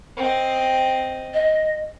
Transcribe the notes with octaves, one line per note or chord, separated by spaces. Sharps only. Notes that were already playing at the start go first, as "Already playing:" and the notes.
C4 D#5
D#5